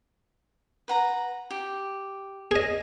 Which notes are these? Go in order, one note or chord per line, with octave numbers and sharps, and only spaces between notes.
B4 F#5 A#5
G4
G#4 D#5